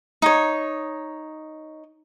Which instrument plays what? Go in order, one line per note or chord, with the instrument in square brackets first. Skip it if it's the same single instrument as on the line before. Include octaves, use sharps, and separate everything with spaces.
[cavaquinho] D#4 C#5